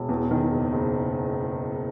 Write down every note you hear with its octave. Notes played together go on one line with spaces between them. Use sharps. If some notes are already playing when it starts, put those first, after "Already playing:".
Already playing: E1
E2
D#3
F#1
F#1